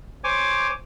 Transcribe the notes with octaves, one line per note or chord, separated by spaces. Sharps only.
C5 C#5 G#5 D6